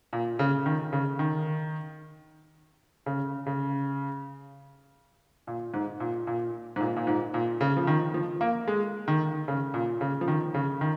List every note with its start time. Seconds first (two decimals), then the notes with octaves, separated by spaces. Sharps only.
0.13 A#2
0.39 C#3
0.66 D#3
0.93 C#3
1.19 D#3
3.06 C#3
3.46 C#3
5.47 A#2
5.74 G#2
6.00 A#2
6.27 A#2
6.76 G#2
6.81 A#2
6.96 A#2
7.07 G#2
7.34 A#2
7.61 C#3
7.77 F3
7.87 D#3
8.14 F3
8.41 A#3
8.68 G#3
9.08 D#3
9.48 C#3
9.74 A#2
10.01 C#3
10.21 F3
10.28 D#3
10.54 C#3
10.81 D#3